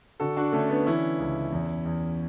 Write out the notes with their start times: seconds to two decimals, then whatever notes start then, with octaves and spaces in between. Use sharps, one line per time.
0.20 D3 F#4 A4
0.37 D4 F#4
0.53 D3 A3 C#4
0.69 B3 D4
0.86 E3 C#4 E4
1.19 C#2
1.52 E2
1.85 E2